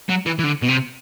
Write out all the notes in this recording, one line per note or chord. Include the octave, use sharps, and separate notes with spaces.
F#3
E3
E3
D3
B2
C3